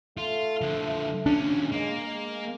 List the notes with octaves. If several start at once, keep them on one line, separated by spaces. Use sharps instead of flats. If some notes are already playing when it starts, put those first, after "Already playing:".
A3 F4
D3 F3
D#2 C#4 D4
G#3 A#3
G#3